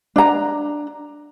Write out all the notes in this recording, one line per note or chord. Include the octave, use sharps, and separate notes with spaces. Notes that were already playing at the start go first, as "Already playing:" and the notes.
D4 A#5